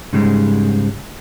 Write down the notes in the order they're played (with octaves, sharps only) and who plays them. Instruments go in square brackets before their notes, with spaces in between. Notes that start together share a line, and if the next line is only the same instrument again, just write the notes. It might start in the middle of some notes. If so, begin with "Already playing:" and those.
[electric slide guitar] G#2 C#3 G3 G#3